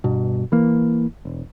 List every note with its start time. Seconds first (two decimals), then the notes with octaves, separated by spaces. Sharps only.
0.04 G2 B2
0.52 E3 A#3
1.25 E1